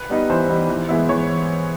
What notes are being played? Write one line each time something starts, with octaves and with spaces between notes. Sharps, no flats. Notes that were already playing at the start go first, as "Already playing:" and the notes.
Already playing: B4
G3 B3 D#4
E3 C5
G3 B3 D#4
E3
G#3 B3 E4
E3 C#5